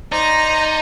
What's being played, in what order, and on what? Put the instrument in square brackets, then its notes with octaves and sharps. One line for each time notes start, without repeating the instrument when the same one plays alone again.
[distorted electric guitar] D#4 [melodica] C5 D5 [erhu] A#5